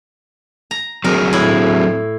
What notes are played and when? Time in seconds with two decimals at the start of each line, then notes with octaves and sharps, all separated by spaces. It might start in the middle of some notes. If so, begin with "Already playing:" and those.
0.71 A#5
1.04 F#3 C4 G#4 A#4
1.33 A2 E4